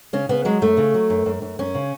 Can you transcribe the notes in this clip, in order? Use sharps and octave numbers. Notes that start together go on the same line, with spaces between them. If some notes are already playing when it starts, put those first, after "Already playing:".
C#3 C#4
C#3 B3
F#3 G#3
F#2 A3
C#3
F#3
F#2
F#2
F#2
F#2 C#4
C#3